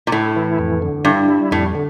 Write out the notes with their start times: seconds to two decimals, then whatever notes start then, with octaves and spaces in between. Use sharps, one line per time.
0.07 A#2
0.12 A2 E4
0.36 E3
0.59 F2
0.82 D3
1.05 G2 E4
1.28 G3
1.51 F2 A2
1.75 D3